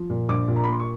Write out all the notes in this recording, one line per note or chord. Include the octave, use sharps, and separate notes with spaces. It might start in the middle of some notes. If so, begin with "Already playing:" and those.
Already playing: F3
A#2
A#1 D6
A#2
A#5
B5
A#3 C6
C#6